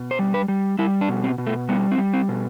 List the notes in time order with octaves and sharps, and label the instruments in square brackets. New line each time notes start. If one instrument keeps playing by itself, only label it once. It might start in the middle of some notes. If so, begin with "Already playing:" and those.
Already playing: [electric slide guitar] B2
C5
G3
B4
G3
G3 E4
D4
B2
C4
B2
A3
G3 B3
C4
G3
C4
B2